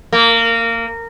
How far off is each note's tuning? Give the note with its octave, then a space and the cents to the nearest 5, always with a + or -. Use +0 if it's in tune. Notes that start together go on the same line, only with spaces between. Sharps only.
A#3 -20